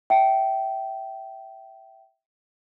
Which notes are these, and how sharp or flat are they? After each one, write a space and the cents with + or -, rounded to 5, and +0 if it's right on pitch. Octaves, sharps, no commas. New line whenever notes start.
E5 +0 G5 -20